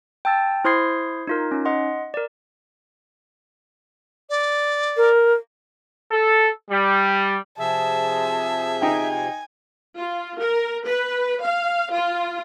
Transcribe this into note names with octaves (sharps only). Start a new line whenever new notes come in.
G5 A5 E6 A6
E4 C5 C6 D#6 G#6 C7
D#4 F4 A#4
C#4 D#4
D#5 F#5 C6
A#4 D5
D5
A#4
A4
G3
C3 F3 G#4 E5 A5
D#4 G5 G#5
F4
A#4
B4
F5
F4